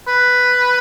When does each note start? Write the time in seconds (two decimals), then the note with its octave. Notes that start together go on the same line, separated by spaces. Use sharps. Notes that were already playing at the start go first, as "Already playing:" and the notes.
0.08 B4